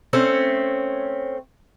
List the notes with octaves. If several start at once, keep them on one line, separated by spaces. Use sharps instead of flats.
A3 C4 C#4